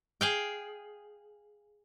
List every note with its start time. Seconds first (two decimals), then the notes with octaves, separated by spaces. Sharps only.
0.21 G#4 F5 G5